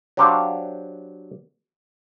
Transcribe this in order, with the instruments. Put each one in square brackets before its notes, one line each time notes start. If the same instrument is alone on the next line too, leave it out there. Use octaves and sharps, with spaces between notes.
[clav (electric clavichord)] F#3 D4 G4 C5 F5